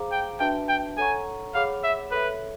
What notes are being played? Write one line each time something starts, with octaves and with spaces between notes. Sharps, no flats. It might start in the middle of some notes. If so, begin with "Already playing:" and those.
Already playing: G#4 C5 F5 A#5 D6
G5
D4 F#4 B4 E5 G5 A5
G5
A4 C#5 F#5 G#5 A#5 C#6
G#4 C#5 F5 F#5 B5 D6
E5
A4 B4 C#5 E5